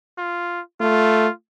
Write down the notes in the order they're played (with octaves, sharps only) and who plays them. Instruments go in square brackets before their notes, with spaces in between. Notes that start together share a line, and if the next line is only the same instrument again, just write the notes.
[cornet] F4
[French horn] A3 [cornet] F4